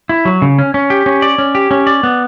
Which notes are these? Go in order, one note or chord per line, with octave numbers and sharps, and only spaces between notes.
E4
F#3
C#3
C#4
C#4
G4
C#4
D5
C#4
G4
C#4
D5
B3